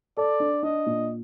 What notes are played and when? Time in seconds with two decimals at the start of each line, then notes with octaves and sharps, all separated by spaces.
0.17 A4 D5
0.40 D4
0.63 D4 D#5
0.86 A#2